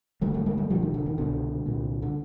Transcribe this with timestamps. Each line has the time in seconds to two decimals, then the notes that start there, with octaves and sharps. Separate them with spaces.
0.21 G#1 F#2 D3 G3 A3
0.34 G3 A3
0.46 G#3 A#3
0.57 G3 A3
0.70 E1 D#2 D3 F3 G3
0.82 D#3
0.94 D3
1.06 D#3
1.18 C2 B2 D3
1.66 C2 A#2
2.02 D3